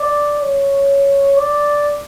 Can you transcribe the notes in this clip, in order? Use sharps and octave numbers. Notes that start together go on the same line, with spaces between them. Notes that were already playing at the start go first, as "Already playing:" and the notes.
Already playing: D5
C#5
D5